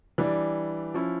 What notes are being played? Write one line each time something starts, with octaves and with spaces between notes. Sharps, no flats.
E3 G3 D4 G4 D5
F3 C#4 E4